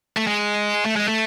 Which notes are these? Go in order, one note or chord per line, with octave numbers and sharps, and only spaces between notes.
A3
G#3
A3
G#3
A3